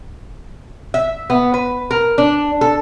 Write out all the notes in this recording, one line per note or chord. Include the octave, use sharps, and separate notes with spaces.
E5
B3
B4
A#4
D4
A4